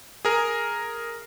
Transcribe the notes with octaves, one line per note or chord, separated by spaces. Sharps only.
G#4 A#4